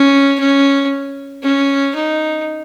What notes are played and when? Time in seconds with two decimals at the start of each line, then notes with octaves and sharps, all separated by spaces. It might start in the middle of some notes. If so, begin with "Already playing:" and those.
Already playing: C#4
0.39 C#4
1.43 C#4
1.95 D#4